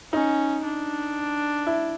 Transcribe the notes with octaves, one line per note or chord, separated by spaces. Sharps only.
C#4 D#4
D4
E4